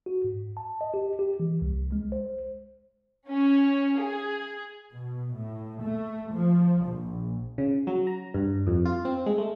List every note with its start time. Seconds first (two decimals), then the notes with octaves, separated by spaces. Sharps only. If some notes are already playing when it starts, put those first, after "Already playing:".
0.06 F#4
0.24 G#2
0.57 A5
0.81 D#5
0.94 G4
1.19 G4
1.40 E3
1.62 C2
1.92 G#3
2.12 C5
3.29 C#4
4.00 G#4
4.93 B2
5.34 A2
5.81 A3
6.32 F3
6.86 A#1
7.58 C#3
7.87 F#3
8.07 A#5
8.34 G2
8.67 F2
8.86 F4
9.05 C4
9.26 G#3
9.38 A3